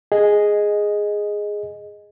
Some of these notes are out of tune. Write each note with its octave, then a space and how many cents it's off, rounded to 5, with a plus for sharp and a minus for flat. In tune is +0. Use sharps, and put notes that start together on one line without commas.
G#4 +0 D#5 +0